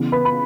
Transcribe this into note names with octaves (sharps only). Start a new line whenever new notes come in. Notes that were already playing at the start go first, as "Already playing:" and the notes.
Already playing: C#3 E3 B3
B4 B5
B5